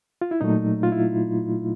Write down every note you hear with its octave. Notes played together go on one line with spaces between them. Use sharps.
F4
E4
A#2 F#3 A3 D#4
F4
E4